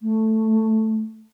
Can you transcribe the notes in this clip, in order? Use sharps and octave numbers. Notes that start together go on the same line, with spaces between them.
A3